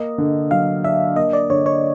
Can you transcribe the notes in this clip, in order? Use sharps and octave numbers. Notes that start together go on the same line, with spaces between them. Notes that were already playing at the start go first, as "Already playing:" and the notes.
Already playing: A#3 D#5
D3
F#3 F5
D4 E5
A#3 D#5
D5
D3 C#5
C#5